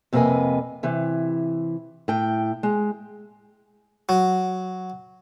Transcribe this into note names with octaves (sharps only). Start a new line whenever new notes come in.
F2 C3 A#3 B4 D#5 G#5
C3 E3
A2 G5
G#3
F#3